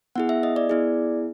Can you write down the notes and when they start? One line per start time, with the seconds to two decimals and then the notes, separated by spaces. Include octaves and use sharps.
0.16 B3 E4 G#4 F#5
0.29 E5
0.43 D#5
0.56 D5
0.69 B3 E4 G#4